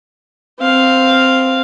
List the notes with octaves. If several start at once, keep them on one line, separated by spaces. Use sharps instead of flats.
C4 F5